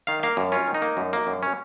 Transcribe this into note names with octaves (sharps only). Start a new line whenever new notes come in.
D#3 F5
A#3 F5
F#2
C#4 F4
D#3
D#4
A#3
F#2
A#3
F#2
C#4